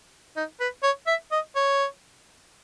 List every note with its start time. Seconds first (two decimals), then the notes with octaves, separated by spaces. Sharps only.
0.36 D#4
0.60 B4
0.83 C#5
1.07 E5
1.32 D#5
1.56 C#5